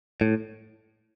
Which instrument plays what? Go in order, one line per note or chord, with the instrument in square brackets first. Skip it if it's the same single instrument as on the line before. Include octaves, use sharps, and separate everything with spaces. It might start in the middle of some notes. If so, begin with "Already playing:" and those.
[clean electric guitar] A2